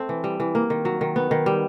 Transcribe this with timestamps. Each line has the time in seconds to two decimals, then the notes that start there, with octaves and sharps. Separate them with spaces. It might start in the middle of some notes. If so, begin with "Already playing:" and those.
Already playing: A3 C4
0.09 E3
0.24 G3
0.40 E3
0.55 A#3
0.70 D#3
0.85 F#3
1.01 D#3
1.16 B3
1.31 D#3
1.46 G3